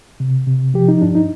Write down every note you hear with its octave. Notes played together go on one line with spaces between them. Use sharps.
C3
C3
F3 G4
D#4
G2 D4
D#4